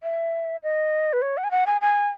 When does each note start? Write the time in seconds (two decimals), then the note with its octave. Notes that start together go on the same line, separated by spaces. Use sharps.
0.03 E5
0.63 D#5
1.13 B4
1.22 C#5
1.37 F#5
1.44 G#5
1.51 F#5
1.67 G#5
1.81 G#5